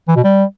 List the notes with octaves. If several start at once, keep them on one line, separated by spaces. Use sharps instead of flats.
E3
B2
G3